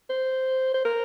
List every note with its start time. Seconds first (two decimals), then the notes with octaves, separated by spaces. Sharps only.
0.10 C5
0.74 C5
0.85 A#4